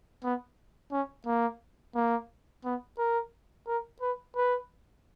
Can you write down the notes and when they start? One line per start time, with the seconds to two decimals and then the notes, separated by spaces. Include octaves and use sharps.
0.24 B3
0.91 C#4
1.26 A#3
1.95 A#3
2.65 B3
2.98 A#4
3.67 A#4
4.01 B4
4.36 B4